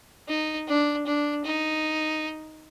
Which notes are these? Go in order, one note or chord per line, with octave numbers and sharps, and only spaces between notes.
D#4
D4
D4
D#4